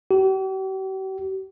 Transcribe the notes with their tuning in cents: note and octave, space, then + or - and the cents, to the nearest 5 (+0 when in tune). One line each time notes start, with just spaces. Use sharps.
G4 -45